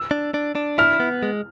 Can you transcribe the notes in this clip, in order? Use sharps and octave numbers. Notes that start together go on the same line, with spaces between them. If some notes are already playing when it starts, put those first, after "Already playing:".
Already playing: E6
D4
D4
D4
E4 F6
B3
G#3